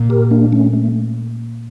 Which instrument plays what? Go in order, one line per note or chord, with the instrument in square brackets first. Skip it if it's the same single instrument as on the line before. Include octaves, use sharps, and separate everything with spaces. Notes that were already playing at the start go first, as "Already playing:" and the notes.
Already playing: [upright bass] A#2
[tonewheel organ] G4 A#4
A#3 D4
A3 C#4
A3